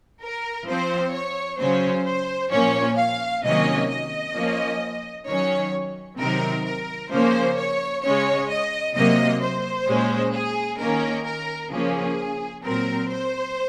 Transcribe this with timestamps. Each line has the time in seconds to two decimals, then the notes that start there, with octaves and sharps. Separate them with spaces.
0.21 A#4
0.68 F3 C4 C5
1.13 C#5
1.59 C#3 F#3 C#4 C5
2.05 C5
2.51 A#2 F3 A#3 C#4 C#5
2.97 F5
3.43 C3 D#3 F#3 A#3 C#4 D#5
3.89 D#5
4.35 F3 A#3 C#4
5.27 D#3 F#3 C#4 C#5
6.19 C3 D#3 F#3 C4 A#4
6.66 A#4
7.11 C#3 F3 A#3 C#4 C5
7.58 C#5
8.03 C#3 G#3 C#4 C#5
8.49 D#5
8.95 C3 F#3 A#3 D#5
9.42 C5
9.87 A#2 G#3 C#4
10.33 G#4
10.80 D#3 A#3 C#4 A#4
11.25 A#4
11.72 C#3 F3 A#3 C#4 G#4
12.64 A#2 F#3 C4 A#4
13.10 C5